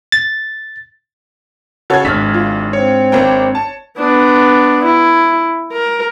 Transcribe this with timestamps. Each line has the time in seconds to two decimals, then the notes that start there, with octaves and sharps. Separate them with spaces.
0.12 A6
1.90 C#3 F#4 A4 C#5 G#6
2.05 G#1 G#2 D4 F6 B6
2.34 F4
2.73 C4 C#5
3.12 G#1 A#3 G5
3.55 A5
3.98 B3 D4
4.85 E4
5.72 A#4